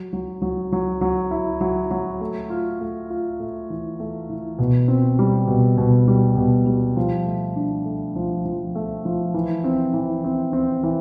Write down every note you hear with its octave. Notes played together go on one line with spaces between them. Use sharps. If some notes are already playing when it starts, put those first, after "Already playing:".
Already playing: F#3
F#3
F#3
F#3
F#3
E4
F#3
F#3
A3
F4
A3
F4
A3
E3
A3
E3
B2
C4
G3
B2
B2
G3
B2
G3
F3
A3
D4
A3
F3
F3
A3
F3
E3
C4
E3
C4
C4
E3